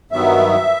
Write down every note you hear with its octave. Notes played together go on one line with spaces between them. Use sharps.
G2 D#3 F#3 B3 E5